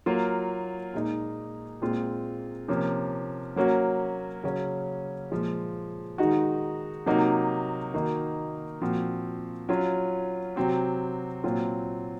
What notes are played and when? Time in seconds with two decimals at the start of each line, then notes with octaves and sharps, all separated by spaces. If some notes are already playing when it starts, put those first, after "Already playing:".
0.06 F#3 A#3 F4
0.94 A#2 G#3 D#4
1.82 A#2 G#3 C4 F4
2.68 C3 F3 A#3 C#4
3.56 F#3 A#3 C#4 F#4
4.44 C#3 F#3 C#4
5.31 A#2 F3 G#3
6.18 D#3 G#3 D#4 F#4
7.06 C3 F#3 A#3 D#4 F#4
7.94 D#3 A#3 D#4 F#4
8.81 A#2 F3 C4 F#4
9.69 F#3 C#4 F4
10.56 C3 F#3 C4 F#4
11.44 A#2 F#3 C4 F4